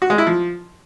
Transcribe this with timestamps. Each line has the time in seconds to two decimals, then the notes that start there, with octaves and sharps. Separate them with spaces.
0.02 F#4
0.10 G#3
0.18 E4
0.27 F3